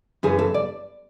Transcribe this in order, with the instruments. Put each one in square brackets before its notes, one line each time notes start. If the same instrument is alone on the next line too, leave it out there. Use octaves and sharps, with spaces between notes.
[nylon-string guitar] F#2 C#3 E3 G#4
A4
D5